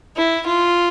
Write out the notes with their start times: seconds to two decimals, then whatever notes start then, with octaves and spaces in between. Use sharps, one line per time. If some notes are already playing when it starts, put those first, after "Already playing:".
0.17 E4
0.46 F4